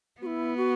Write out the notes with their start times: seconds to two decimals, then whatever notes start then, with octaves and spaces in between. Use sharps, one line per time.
0.21 B3 F#4
0.26 E4
0.57 F#4